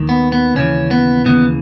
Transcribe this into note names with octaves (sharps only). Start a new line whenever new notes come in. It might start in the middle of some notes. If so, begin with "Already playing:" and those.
Already playing: D#2 D#3
B3
B3
D#2 C#3 E3 C#4
B3
D#2 C#3 E3 B3